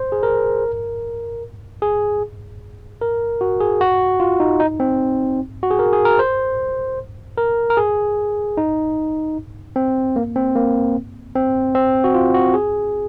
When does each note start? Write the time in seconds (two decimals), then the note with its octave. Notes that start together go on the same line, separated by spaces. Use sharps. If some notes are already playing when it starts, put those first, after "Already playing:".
Already playing: C5
0.12 G#4
0.23 A#4
1.82 G#4
3.01 A#4
3.41 F#4
3.61 G#4
3.81 F#4
4.20 F4
4.40 D#4
4.60 D#4
4.80 C4
5.63 F#4
5.71 G#4
5.79 A#4
5.93 G#4
6.05 A#4
6.19 C5
7.38 A#4
7.70 A#4
7.77 G#4
8.57 D#4
9.76 C4
10.16 A#3
10.36 C4
10.55 A#3
11.35 C4
11.75 C4
12.04 F#4
12.14 F4
12.34 F#4
12.54 G#4